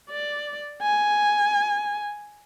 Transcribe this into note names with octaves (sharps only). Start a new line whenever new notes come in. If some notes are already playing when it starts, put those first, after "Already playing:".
D5
G#5